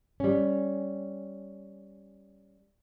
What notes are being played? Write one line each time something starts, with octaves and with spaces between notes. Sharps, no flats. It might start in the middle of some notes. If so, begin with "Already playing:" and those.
G3 C#4